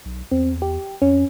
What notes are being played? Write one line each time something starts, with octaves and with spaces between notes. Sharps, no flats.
B1
E2 C4
G4
F2 C#4